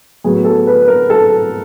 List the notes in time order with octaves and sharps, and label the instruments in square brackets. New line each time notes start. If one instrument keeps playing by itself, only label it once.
[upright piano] A2 F#3 B3 G#4
A4
B4
A#4
A4